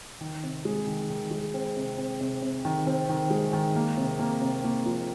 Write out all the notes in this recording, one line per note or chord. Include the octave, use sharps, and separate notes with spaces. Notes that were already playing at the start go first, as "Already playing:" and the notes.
D#3
C3
G#3
D#3
D#3
G#3
C4
C3
C4
C3
C3
D#3
C4
D#3
G#3
D#3
A#3
C3
A#3
C3
A#3
F3